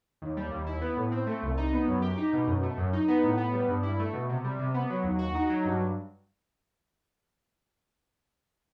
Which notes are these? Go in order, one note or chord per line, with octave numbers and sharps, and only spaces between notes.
D#2
G3
D#2
E4
B3
A2
C4
A3
C2
D#4
B3
F#2
G4
D#4
B2
F#2
A3
F#2
D#4
B3
A2
B3
G3
G2
E4
A3
B2
C3
G3
C3
B3
F#3
D#2
F#4
D#4
F#3
G2